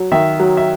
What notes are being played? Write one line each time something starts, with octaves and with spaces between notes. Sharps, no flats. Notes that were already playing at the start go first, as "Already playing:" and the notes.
Already playing: F#3
D#3 E5
F#3
E5